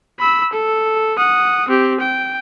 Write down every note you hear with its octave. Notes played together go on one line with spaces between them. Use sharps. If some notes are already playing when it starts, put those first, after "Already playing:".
B5 E6
A4
F#5 D#6
C4 G4
G5